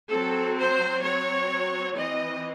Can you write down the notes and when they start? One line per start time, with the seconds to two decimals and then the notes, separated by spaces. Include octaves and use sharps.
0.10 F#3 C4 A4
0.57 C5
1.03 F#3 C4 C#5
1.96 E3 C4 D#5